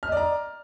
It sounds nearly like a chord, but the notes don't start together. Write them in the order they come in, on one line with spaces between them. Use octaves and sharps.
F6 D#5 D5 A#5